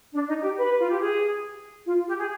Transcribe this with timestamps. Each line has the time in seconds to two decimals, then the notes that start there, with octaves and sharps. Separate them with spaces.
0.14 D4
0.28 D#4
0.43 G4
0.58 B4
0.80 F4
0.90 G4
1.00 G#4
1.87 F4
2.08 G4
2.19 G#4